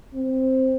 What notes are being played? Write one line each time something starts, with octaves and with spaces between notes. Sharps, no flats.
C4